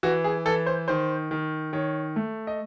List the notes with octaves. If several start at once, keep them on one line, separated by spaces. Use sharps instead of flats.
E3 F#4
G#4
E3 A4
C5
D#3 C5
D#3
D#3 C#5
A3
D#5